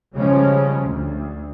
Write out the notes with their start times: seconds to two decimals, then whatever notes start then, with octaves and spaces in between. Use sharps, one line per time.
0.13 C#3 F3 G3 G#3 C#4
0.81 D2